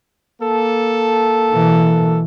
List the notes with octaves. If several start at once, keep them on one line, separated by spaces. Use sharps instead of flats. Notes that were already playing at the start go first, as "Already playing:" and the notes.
A#3 A4
B2 E3